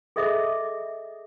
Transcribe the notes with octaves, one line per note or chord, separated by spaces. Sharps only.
G#4 A4 D#5 E5 D6